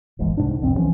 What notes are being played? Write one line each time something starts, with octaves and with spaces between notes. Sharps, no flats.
D1 G1 G#2 E3
C2 G#2 D4
E1 C2 F2 C4
C2 E3 F3 C#4